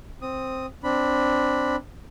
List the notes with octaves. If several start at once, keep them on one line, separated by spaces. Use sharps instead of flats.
C4 D#6
C4 D4 B5